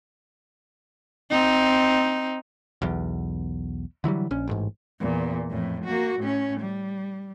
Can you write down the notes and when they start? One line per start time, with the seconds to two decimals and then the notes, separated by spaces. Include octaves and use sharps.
1.31 C4 D#4
2.82 B1 E2
4.04 D3 E3 F#3 G3
4.31 A#1 C#4
4.48 A1 G#2
5.00 E2 A#2
5.50 F2 A2
5.85 A#3 F#4
6.20 A2 C#4
6.60 G3